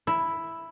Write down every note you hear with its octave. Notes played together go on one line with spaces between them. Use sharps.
E4